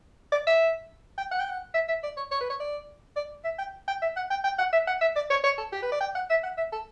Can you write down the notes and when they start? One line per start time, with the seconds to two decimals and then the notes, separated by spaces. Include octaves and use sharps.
0.32 D5
0.47 E5
1.18 G5
1.31 F#5
1.40 G5
1.49 F#5
1.74 E5
1.88 E5
2.03 D5
2.17 C#5
2.31 C#5
2.41 B4
2.50 C#5
2.60 D5
3.16 D5
3.44 E5
3.59 G5
3.88 G5
4.02 E5
4.17 F#5
4.30 G5
4.44 G5
4.58 F#5
4.72 E5
4.88 F#5
5.01 E5
5.16 D5
5.30 C#5
5.44 C#5
5.58 A4
5.72 G4
5.82 B4
5.92 D5
6.01 G5
6.15 F#5
6.30 E5
6.43 F#5
6.58 E5
6.72 A4